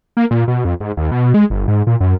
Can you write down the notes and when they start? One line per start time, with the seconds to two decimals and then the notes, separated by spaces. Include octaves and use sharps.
0.17 A#3
0.31 A#2
0.48 B2
0.65 F2
0.80 G#2
0.97 D#2
1.12 B2
1.34 G#3
1.50 G1
1.68 G#2
1.87 A#2
2.00 F#2